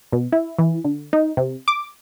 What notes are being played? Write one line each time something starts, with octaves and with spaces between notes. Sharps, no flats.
B2
E4
E3
D3
D#4
C3
D6